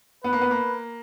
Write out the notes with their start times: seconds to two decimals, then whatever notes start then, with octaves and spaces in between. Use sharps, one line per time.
0.24 B3 B4
0.33 A#3
0.41 B3
0.51 A#3